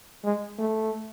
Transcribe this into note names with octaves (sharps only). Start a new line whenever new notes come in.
G#3
A3